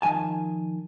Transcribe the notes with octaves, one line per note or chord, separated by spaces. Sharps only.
D#3 F3 G#5 A5